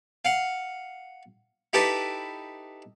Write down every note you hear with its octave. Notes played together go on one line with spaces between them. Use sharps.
F5 F#5
D#4 E4 G4 A4 B4 D#5